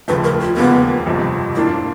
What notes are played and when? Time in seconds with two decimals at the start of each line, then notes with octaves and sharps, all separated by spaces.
0.08 F1 D#2 C#3 F3 A3 B4
0.24 A#4
0.40 F4
0.56 E1 D#2 C#3 F3 A#3 B3
1.06 G1 F2 C3 F3
1.55 G#2 F3 A#3 D4 E4 F4